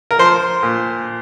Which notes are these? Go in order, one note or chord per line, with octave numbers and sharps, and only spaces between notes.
A#4
F3 C5
A#2